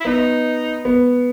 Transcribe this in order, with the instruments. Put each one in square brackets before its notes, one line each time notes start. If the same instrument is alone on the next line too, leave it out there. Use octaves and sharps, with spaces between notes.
[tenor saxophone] E4
[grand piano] B3 [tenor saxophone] D#4
[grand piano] B3